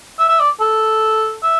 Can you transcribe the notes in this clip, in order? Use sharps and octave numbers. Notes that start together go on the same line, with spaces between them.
E5
E5
D5
A4
E5